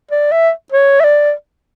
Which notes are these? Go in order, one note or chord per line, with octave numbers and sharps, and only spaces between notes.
D5
E5
C#5
E5
D5